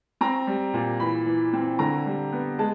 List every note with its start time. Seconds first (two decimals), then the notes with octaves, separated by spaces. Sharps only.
0.21 C4 A#5
0.47 G3
0.74 A#2
1.00 E3 B5
1.26 E3
1.53 C4
1.79 D3 A#5
2.06 G3
2.32 B3
2.59 G#3 A5